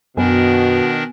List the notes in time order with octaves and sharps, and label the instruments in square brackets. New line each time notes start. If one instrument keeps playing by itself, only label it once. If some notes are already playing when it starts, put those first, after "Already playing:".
[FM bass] F#2 [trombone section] B2 [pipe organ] D#3 D4 A#4 [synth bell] B3 G#5